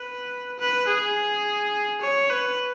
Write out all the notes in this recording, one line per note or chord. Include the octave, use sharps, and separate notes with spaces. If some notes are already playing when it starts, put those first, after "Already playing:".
Already playing: B4
B4
G#4
C#5
B4